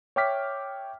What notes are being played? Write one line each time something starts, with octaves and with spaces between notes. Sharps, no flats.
C#5 E5 G5 D6 F6 B6